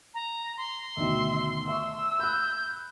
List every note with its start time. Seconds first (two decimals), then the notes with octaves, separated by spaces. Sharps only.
0.14 A#5
0.57 C6
0.97 D2 B2 D#3 E5
1.68 E5 C#6 E6
2.19 B5 F#6 G6